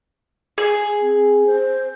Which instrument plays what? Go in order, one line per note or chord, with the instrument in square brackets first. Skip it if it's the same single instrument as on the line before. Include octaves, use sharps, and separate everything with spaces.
[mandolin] G#4
[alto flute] C4
C5